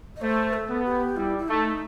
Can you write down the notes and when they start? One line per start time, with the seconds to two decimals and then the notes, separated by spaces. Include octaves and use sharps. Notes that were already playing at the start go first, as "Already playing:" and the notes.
0.16 D#5
0.22 A3 C5
0.53 A4
0.70 B3
0.85 G4
1.17 G3 E4
1.38 E4
1.48 A3 D#4